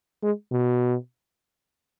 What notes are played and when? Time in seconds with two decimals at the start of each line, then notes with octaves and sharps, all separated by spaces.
0.23 G#3
0.52 B2